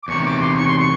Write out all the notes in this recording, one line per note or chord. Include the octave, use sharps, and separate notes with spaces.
D6
E2 C3 D#3 C#6
D6
C6
C#6
C6
C#6